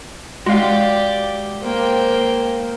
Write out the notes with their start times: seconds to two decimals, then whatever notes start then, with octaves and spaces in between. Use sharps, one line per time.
0.46 G#3 F#4 G4 D5 F5
1.63 A#3 C5 G5